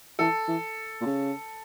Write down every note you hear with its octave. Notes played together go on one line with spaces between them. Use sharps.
E3 A4
E3
A#2
C#3